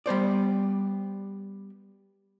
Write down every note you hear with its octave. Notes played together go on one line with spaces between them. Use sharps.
G3 B3 C5 D5